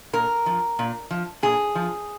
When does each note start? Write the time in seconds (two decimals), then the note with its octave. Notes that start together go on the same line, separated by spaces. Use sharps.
0.13 A#2 A#4
0.46 F3
0.79 A#2
1.11 F3
1.43 A#2 G#4
1.75 F3